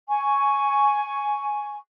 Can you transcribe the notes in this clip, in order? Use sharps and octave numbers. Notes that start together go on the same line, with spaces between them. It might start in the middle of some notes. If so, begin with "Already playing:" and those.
G#5 C#6